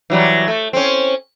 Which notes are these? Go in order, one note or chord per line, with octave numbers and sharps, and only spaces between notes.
E3 F#3 G3
A3
C4 C#4